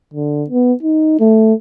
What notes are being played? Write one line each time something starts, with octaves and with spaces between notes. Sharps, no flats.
D3
B3
D#4
A3